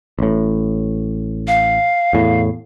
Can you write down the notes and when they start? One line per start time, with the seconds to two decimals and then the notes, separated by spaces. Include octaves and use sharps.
0.19 A1 A2
1.48 F5
2.13 E2 A2